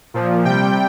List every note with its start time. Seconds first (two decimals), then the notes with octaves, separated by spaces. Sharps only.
0.14 A#2 F3
0.45 C3 G3 G5